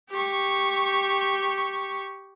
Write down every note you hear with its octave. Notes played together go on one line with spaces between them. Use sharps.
G4 C#6